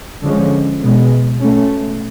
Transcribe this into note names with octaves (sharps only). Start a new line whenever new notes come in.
D3 F3 G#3 C#4
B2 G#3 B3
B2 A3 C#4